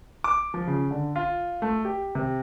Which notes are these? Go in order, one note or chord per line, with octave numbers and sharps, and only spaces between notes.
D6
F3
C#3
D3
F4
A3
G4
C3